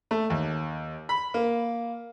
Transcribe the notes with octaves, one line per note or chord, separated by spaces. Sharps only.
A3
D#2
B5
A#3